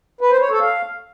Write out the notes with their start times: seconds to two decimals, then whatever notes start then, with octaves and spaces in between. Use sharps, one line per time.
0.21 B4
0.31 C5
0.41 C#5
0.51 A4
0.61 F5